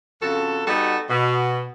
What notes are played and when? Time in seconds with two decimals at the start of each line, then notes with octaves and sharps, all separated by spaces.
0.22 F2 C#3 F#4 A4
0.67 G3 B3 D#4 F#4 G4 A4
1.10 B2